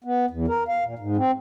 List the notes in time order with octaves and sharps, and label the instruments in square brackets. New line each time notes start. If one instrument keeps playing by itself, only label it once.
[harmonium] B3
E2
A#4
F5
A#2
G#2
C4